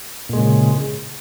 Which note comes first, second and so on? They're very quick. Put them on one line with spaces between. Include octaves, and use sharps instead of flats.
A#2 G#3 C#3